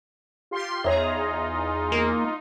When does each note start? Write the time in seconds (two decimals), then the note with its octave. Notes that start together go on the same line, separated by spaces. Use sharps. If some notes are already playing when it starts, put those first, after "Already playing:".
0.51 F4 G4 C6
0.84 E2 D#4 F4 G#4 C#5 E5 A#5
1.92 A#3